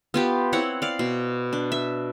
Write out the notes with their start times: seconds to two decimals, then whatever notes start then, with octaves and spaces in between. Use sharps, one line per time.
0.14 B3 F4 G4
0.53 C4 E4 C#5 F#5
0.82 D5 F5
0.99 B2
1.53 D4
1.72 E5